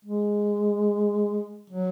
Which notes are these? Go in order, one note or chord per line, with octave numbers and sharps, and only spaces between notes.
G#3
F#3